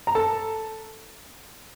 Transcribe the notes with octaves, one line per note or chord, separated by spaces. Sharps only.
A#5
A4 A5